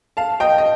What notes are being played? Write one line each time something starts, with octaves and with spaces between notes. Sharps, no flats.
F5 A5
D#5 G5
D#5